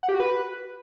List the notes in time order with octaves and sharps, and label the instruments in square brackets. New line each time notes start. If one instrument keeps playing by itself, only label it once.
[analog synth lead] F#5
G4
F#4
B4